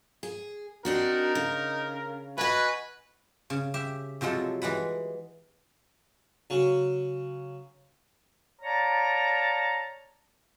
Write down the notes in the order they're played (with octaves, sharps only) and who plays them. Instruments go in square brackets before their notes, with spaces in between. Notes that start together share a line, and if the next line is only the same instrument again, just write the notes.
[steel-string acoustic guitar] G#4
[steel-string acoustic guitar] C4 D4 F#4 [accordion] D#4 [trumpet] A#4
[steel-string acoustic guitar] C#3
[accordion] F#4 G#5 [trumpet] B4 [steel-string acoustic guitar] D#5 E5
[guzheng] C#3
G4 E5
C3 F3 F#3 G#3 A4
E3 G#3 F#5 B5
[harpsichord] C#3 F#3
[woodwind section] C#5 D5 F5 A5 A#5